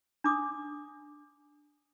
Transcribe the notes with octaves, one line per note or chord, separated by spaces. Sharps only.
D4 D6 D#6